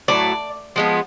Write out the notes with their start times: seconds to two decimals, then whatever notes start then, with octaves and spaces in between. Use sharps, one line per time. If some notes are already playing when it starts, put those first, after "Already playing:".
0.08 A2 F#3 A3 D5
0.76 F3 G#3 B3